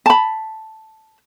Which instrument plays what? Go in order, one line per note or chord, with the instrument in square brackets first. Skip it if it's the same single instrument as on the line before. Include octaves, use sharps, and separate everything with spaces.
[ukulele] A5 B5